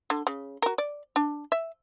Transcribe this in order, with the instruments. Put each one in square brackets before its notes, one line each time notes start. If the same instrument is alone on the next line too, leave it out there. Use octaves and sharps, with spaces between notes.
[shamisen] D3
C#3
F#4 A#4
D5
D4
E5